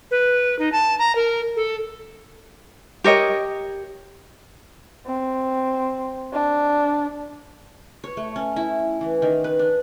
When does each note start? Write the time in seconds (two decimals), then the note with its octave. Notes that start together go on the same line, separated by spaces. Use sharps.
0.11 B4
0.59 D#4
0.72 A5
0.99 A#5
1.15 A#4
1.56 A4
3.04 G4 A#4 C#5 D#5
5.07 C4
6.33 D4
8.04 C#5
8.17 A3
8.36 C#4
8.56 E4
9.01 E3
9.22 D#3
9.44 B4
9.59 D4